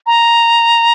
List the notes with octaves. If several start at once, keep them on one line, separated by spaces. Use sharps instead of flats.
A#5